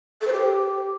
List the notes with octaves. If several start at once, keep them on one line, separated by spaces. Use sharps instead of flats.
A4
C5
G4